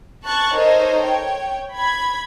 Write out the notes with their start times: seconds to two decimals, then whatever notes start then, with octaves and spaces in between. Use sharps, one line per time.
0.24 A5 C#6 F#6 A6
0.54 D#4 A4 A#4 C5 C#5 D#5
1.01 C#5 G5
1.75 B5 G#6